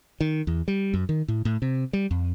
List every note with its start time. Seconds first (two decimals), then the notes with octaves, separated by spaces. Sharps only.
0.21 D#3
0.47 E2
0.68 G3
0.94 F#2
1.09 D#3
1.28 A2
1.45 A2
1.62 C3
1.93 G3
2.11 F2